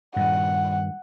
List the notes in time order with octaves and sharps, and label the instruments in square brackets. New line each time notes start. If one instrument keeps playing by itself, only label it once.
[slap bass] G2 A#2 D#3 [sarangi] F#5